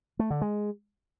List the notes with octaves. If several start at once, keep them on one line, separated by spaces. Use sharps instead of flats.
A3
D3
G#3